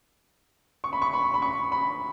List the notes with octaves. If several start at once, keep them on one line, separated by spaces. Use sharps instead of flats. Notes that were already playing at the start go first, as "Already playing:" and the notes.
C#6
B5
C#6
B5
B5
C#6
B5